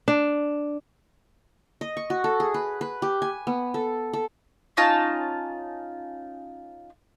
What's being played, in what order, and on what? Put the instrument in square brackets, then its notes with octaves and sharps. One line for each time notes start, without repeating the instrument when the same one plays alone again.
[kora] D4
[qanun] D#5
C#6
F#4
A4
G#4
B4
B4
G4
G#5
B3
A4
A4
[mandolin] C#4 D#4 F4 A5